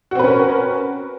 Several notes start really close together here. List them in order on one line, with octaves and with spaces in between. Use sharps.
F#4 C4 B4 C#4 A#4